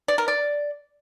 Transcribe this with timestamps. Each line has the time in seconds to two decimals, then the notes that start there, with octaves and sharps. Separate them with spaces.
0.08 D5
0.18 A#4
0.28 D5